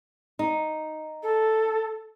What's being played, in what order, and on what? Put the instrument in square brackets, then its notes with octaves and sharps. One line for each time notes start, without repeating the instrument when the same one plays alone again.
[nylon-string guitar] D#4
[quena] A4